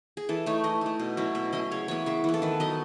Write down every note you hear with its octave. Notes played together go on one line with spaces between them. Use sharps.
G#4
E3 A4
A3 D#4 C#5
E3 D#5
A3 D#4
B2
F#3 C#4 E4
B2 E5
F#3 C#4 E4 D#5
C#3 C#5
E3 B3 C#5
C#3 E5
E3 B3
A4
D#3 B4
F#3 B3 D#4 D#5